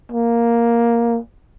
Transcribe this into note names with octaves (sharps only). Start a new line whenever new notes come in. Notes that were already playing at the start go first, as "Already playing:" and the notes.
A#3